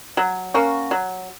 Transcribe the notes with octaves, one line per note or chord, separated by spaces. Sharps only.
F#3
A#3 C#4 F#4
F#3